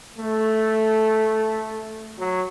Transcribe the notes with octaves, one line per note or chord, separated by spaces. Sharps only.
A3
F#3